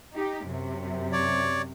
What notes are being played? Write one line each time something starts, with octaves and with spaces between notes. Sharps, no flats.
D#4 G4
F#2 C3
C#5 D5